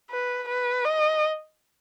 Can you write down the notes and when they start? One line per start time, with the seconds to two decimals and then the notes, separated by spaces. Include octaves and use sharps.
0.11 B4
0.48 B4
0.85 D#5